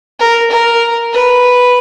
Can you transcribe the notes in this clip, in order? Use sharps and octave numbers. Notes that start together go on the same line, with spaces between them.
A#4
A#4
B4